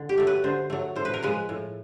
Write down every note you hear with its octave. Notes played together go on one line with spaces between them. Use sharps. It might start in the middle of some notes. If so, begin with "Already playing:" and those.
Already playing: D3
G4
F#3 A3
B4
D3 C5
F#3 A3
A2 C5
B4
A#4
F3 G#3 B4
A2